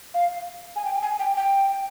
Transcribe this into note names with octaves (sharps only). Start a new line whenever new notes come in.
F5
G#5
G5
G#5
G5
G5